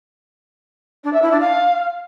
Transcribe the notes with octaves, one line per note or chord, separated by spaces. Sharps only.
D4
E5
E4
D4
F5